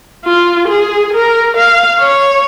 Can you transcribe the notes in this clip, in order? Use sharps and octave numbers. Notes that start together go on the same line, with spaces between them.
F4
G#4
A#4
F5
C#5